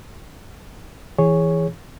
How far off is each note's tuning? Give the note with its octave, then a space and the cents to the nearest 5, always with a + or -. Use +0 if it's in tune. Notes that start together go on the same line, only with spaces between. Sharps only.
E3 +0 G#4 -10 C#5 +0